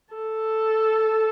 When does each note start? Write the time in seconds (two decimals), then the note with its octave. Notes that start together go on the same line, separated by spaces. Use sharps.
0.14 A4